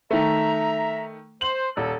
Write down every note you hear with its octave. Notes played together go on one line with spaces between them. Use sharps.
D#3 A3 E5 A#5
C5 F#7
D#1 A4